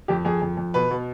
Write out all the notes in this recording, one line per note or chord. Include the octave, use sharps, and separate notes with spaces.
F2 G4
F2 G#4
F2
F2
B2 B4
B2